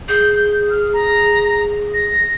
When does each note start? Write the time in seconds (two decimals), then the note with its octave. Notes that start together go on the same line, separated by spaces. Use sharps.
0.09 G#4 G6
0.70 F6
0.93 A#5
1.94 A#6